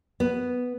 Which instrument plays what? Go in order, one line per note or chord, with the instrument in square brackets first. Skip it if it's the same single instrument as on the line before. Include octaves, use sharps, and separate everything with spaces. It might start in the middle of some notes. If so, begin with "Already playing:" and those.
[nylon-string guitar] B3